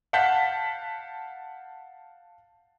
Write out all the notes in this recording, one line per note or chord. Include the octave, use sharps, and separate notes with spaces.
F5 F#5 A5 G6 B6